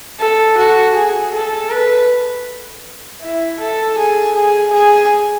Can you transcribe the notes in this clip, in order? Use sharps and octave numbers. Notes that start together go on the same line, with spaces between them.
A4
F#4
G#4
A4
B4
E4
A4
G#4
G#4
G#4